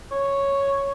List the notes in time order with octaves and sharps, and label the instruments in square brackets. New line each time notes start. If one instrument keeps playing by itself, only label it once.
[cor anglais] C#5